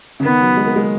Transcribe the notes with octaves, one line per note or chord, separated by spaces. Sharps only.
C#3
D#3 B3
F#3
G#3
A#3
G#3